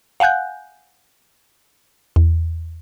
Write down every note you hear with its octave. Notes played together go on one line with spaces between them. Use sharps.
F5 F#5 G#5 F#6 G6
E2